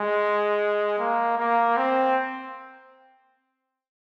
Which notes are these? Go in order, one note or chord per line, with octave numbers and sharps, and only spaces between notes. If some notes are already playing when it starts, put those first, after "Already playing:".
Already playing: G#3
A#3
A#3
C4